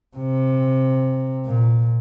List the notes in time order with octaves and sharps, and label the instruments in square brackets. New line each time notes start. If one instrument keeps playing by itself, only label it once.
[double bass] C3
A#2